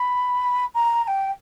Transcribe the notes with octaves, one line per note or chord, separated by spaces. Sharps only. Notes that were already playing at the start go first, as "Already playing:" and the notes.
Already playing: B5
A#5
A#5
G5